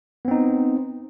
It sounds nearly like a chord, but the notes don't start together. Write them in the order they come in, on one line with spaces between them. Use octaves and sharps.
B3 C4 D#4